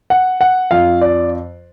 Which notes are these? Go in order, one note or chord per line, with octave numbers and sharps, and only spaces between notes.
F#5
F#5
F2 F3 F5
D5